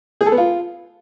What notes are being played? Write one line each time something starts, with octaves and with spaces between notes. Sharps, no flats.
G#4
A4
B3
F4